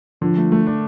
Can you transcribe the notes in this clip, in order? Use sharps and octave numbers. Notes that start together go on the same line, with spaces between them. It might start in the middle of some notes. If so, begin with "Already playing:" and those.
D3 F3
A3
A3
D4